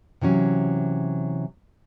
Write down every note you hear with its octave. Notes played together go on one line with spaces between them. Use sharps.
C3 E3 F#3 C#4